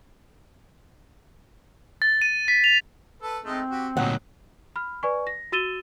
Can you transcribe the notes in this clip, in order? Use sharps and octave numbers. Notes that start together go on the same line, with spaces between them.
A6
D#7
B6
F7
A4 B4
G#3 A3 C4 D#4
F#4 G4
D2 A#2 D#3 F#3 C#4 F#5
B5 F6
B4 D5 G#5 C#6
A#6
F#4 E6 A6 D#7 E7 G7